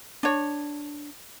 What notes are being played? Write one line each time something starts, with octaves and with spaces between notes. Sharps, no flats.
D4 C#5